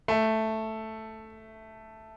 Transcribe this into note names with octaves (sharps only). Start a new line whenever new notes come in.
A3